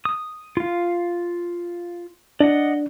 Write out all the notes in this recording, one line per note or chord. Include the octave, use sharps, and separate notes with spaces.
D#6
F4 F5
D4 D5 D#5 F#5